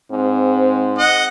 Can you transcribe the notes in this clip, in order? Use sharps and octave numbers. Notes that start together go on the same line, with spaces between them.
G#2 C4
D#5 F#5